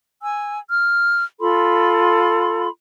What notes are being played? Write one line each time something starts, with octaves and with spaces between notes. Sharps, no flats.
G#5 E6
F6
F4 A4 B5 C6